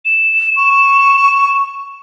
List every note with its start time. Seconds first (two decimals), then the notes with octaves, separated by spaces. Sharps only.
0.05 E7
0.57 C#6